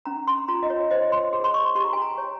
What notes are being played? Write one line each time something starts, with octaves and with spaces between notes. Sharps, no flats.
C#4 A#5
C6
F4 A#5
D#5
C#5
C5 D#5
C6
G#4
C6
C#6
G4 C6
A#5
G#5
A#5
C#5